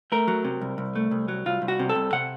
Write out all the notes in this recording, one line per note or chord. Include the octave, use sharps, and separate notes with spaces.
A3 A#4
F#3
C3
C2
C2
A3
C2
F#3
C2 F4
C2
F#4
C3
A4
C2
C3 F#5